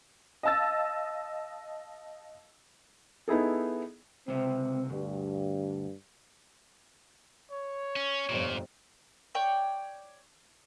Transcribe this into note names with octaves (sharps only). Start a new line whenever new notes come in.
D#5 F5 A5 E6 A6
B3 D#4 E4 G#4 A4
C#2 C3 C4
D2 G2
C#5
C#4
G1 F2 A#2
C#5 D5 G5 C#6